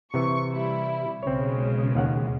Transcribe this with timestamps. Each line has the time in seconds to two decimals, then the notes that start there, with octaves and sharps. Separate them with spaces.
0.14 C3 E3 C#6
0.53 G3 E4
1.23 B1 C#3 G#3 C4 C#5
1.95 D#2 F5 F#5